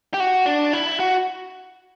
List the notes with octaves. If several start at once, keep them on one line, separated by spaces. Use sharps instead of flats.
G4
F#4
D4
E4
F#4